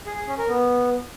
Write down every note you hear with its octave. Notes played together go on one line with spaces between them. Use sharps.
G#4
G#4
C#4
A#4
B3